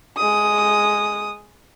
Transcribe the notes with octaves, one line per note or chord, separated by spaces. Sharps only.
G#3 D#6